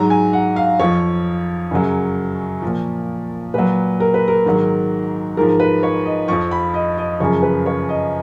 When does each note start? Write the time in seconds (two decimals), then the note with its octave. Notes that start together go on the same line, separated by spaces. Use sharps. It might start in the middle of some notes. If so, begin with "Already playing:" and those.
Already playing: G#2 F#3 A#5
0.10 G#5
0.33 F#5
0.56 F5
0.80 F2 F3 C#5
1.71 F#2 C#3 F#3
2.62 A#2 F3
3.54 A#2 F#3 B4
4.00 A#4
4.14 B4
4.28 A#4
4.46 G#2 D#3 F#3
5.37 G#2 F3 A#4
5.60 B4
5.83 C#5
6.06 D#5
6.28 F2 F3 C#6
6.51 B5
6.74 D#5
6.98 D#5
7.20 F#2 C#3 F3 C#5
7.43 B4
7.66 C#5
7.89 D#5